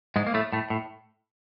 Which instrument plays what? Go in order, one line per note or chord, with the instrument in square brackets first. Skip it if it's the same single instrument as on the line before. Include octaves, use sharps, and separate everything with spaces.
[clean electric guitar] G#2 G#3
A#3
A2 A3
A2 A3
A2